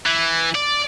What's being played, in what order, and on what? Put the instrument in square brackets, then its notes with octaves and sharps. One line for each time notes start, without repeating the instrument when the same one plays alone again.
[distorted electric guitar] E3
D5